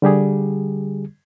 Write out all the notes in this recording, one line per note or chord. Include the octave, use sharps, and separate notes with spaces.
D3 G3 G4 G#4